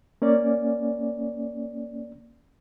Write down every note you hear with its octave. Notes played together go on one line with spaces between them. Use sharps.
A#3 C#4 D5